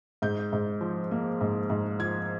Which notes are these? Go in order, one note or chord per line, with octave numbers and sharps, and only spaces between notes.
G#2 G6
G#2
F3
A#3
G#2
G#2
F3 G#6